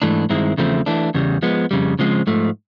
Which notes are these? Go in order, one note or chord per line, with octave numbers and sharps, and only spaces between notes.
G#2 E3 A3 D4
G2 D#3 G#3 C4 E4
E2 C#3 F3 A3 C4
E3 A3 D4
E2 C#3 G3
F3 G#3 B3
F2 C#3 G3
C#3 F3 G#3 C4
G#2 F3 A3